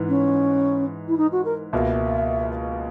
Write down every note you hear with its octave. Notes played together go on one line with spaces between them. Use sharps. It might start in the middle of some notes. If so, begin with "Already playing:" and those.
Already playing: G#2 E3 B3
C#4
E4
D#4
F#4
A#4
C#2 B2 A#3 E5